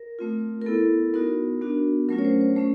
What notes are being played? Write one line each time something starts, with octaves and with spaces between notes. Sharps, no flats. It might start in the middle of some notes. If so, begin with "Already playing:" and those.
Already playing: A#4
A3 C4 F4
A#4
B3 E4 A4
B3 D#4 F#4 A#4
B3 D4 F#4
F#3 A3 C#4 F4 A#4
C#5
C5
C5
A3 C#4 C5